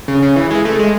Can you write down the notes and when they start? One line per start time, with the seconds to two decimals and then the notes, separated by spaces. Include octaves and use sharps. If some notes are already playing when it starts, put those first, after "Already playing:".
0.08 C#3
0.23 C#3
0.36 E3
0.51 G#3
0.65 A3
0.79 G#3